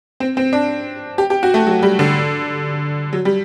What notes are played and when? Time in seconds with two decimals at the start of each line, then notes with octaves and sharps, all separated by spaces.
0.20 C4
0.37 C4
0.53 D4
1.18 G4
1.30 G4
1.43 F#4
1.54 A3
1.67 F#3
1.82 G3
1.99 D3
3.13 F#3
3.25 G3